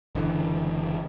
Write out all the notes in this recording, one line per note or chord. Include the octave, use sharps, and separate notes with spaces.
F#1 D3 E3